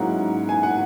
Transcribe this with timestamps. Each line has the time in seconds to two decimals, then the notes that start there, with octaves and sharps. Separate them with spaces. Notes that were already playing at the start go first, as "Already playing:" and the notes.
Already playing: G#2 F#3 A#3 C#4 E4 F#5
0.49 G#5
0.63 F#5